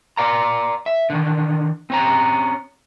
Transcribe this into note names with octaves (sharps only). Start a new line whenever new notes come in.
D5 F5 A#5
E5
D3 D#3
C4 C#4 A#5